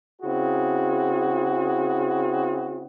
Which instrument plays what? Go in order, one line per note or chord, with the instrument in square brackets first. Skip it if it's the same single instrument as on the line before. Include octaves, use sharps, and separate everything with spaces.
[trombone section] C#3 C4 E4 F#4 G#4